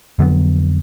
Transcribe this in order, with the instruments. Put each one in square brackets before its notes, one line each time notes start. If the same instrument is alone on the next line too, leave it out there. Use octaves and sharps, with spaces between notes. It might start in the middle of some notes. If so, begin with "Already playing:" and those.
[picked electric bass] F2 D3 F#3 B3